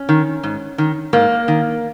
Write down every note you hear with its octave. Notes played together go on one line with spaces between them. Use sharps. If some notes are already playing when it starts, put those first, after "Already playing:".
Already playing: C#4
D#3
G#2
D#3
G#2 A#3
D#3